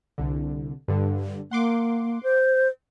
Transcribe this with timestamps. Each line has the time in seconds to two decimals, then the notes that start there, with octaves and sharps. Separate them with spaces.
0.18 C2 D3
0.88 G2 D3
1.51 A#3 F#5 C6 D6
2.23 C5